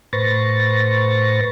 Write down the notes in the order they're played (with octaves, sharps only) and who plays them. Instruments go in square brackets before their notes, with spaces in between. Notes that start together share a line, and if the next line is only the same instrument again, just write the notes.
[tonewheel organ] A2 B4 C5 C#6 A6 A#6